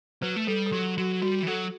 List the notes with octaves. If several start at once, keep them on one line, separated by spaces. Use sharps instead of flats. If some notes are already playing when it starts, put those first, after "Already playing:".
F#3 B4
A3
G3 A4
A4
F#3 G4
F#3 F#4
G3 F#4
E3
F#3 A4